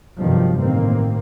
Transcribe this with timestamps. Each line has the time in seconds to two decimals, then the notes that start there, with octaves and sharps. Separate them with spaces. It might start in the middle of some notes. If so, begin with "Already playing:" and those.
0.19 G1 G2 C3 D#3 F3 F#3
0.58 A1 D#3 A#3 C4